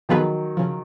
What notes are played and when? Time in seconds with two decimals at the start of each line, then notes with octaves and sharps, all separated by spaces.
0.09 D#3 F3 F#3 B3 F4 G#4 B4
0.57 C#3 F3